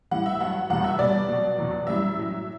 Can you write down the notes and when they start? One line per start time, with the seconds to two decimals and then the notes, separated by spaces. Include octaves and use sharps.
0.11 A2 E3 G3 F#5
0.26 E5
0.41 G2 F#3 F#5
0.70 E2 B2 G3 F#5
0.84 E5
0.99 B2 G3 D5
1.29 B2 F#3
1.58 E2 B2 F#3
1.86 F#2 E3 G3 E5
2.15 A2 F#3